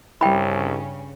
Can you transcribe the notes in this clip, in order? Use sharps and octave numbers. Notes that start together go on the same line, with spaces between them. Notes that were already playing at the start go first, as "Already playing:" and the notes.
C2 G2 C#3 G3 C#4 E4 G5 B5